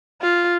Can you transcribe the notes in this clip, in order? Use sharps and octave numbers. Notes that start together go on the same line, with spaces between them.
F4